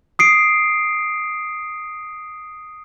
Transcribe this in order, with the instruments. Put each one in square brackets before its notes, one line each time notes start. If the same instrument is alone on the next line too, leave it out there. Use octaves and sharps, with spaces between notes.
[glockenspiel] D#6 C7 D7